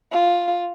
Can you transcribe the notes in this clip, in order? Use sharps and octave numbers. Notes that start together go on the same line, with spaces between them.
F4